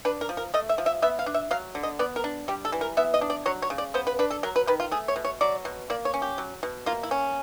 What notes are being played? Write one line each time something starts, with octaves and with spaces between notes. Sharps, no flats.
D4 B4
A#4
F3
A#4
A3 D#5
E5
F3
E5
B3 E5
F5
D4
E5
F#3 F5
D3
D#5
B3 D5
A#4
D4
G3 G4
A4
E3
A#4
B3 E5
D#5
D4
D5
F#3 C#5
C#5
C#3
D5
B3 C5
B4
D4 B4
A4
F#3 A#4
B4
D#3 B4
F4
A3 G#4
C#5
B2
C#5
F#3 D5
B2
A#3 D5
C#5
C#4
G4
F#3
B2
A#3 F4
E4
C#4